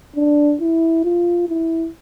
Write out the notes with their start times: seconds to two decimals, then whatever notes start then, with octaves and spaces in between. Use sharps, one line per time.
0.16 D4
0.61 E4
1.05 F4
1.48 E4